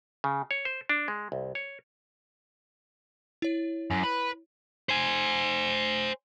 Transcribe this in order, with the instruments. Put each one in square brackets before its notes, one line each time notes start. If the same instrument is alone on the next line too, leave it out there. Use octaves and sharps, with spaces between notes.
[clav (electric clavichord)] C#3
C#5
C5
D4
G#3
C2
C#5
[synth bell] E4 C#5
[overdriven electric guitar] F#2
B4
[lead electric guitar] C5 G#5